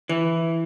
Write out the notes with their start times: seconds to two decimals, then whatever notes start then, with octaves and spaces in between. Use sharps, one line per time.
0.09 E3